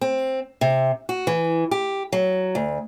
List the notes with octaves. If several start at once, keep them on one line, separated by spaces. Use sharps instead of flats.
C4
C3
F#4
E3
G4
F#3
D2